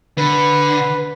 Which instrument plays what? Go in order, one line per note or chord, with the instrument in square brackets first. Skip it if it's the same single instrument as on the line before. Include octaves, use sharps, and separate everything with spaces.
[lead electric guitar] D3 [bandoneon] B4